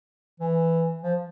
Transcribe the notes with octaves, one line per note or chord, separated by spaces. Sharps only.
E3
F3